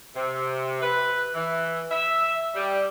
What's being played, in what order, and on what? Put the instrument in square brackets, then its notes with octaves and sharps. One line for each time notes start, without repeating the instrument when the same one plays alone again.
[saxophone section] C3
B4
E3
E5
G3